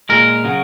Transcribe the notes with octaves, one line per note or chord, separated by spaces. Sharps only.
A#2 G#3 A#4
C#3 F#3